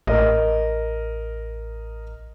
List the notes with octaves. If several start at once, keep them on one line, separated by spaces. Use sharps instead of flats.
A1 A#4 D#5